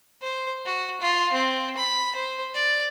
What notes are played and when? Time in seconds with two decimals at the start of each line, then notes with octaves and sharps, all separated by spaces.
0.21 C5
0.66 F#4
1.01 F4
1.32 C4
1.77 B5
2.16 C5
2.54 D5